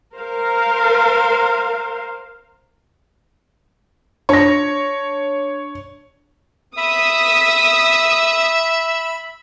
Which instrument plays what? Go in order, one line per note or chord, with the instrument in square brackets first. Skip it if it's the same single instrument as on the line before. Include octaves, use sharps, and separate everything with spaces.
[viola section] A#4 C5 F5
[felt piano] D4 A#6 [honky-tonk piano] C#5
[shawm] E5 [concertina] B5 [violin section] D#6 B6